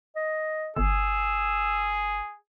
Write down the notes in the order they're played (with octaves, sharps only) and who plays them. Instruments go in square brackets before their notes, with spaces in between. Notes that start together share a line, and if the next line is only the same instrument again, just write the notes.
[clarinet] D#5
[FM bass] G1 [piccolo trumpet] G#4 [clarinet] E6